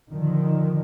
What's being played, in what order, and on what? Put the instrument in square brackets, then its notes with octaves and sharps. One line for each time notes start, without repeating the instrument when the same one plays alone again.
[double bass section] D3 D#3 F3